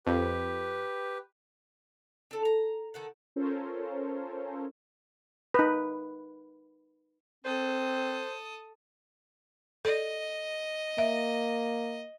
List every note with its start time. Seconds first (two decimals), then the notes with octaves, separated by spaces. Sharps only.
0.06 F2 G4 B4
2.31 D4 A4
2.45 A#5
2.94 D#3 A4 F#5
3.36 C#4 F4 A4 A#4 C5 C#5
5.54 D#4 B4
7.45 C4 A4 C5 D#6
9.85 A4 D5 D#5
10.98 A#3 E5